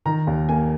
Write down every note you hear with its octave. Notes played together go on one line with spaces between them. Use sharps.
D#3 A#5
D#2
A#3 G#5